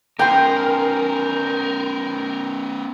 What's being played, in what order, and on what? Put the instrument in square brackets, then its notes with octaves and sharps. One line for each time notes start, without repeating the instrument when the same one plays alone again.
[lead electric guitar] B3 C#4 [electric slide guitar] A#4 [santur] G5 C6